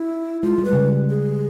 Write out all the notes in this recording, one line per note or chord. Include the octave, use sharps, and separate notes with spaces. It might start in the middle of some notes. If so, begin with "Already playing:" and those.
Already playing: E4
G#3 F4
G3
B4
C#3
G#4